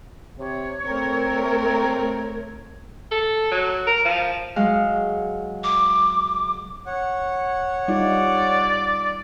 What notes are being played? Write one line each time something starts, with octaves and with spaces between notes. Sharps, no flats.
C3 C#5
A3 C4 A#4
A4
F#3
A#4
F3
F#3 G#3 F5
D6
C#5 F#5
G3 D#4 F4 D5